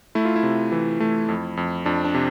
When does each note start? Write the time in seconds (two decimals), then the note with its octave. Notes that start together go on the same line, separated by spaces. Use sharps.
0.15 A3 E4
0.25 F4
0.36 E4
0.43 C3
0.72 E3
1.00 A3
1.29 F2
1.57 F2
1.86 F2 D4
2.05 D4
2.14 C3